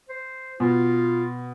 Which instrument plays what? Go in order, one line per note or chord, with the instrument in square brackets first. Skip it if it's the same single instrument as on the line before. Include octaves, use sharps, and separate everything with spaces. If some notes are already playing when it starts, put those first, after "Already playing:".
[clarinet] C5
[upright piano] B2 [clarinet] F4